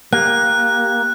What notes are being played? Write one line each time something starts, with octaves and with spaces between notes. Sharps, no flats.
A#3 G4 F#6